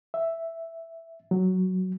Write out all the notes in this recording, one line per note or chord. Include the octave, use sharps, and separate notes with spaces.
E5
F#3